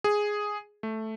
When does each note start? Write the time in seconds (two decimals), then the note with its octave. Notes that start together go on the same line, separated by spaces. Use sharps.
0.04 G#4
0.83 A3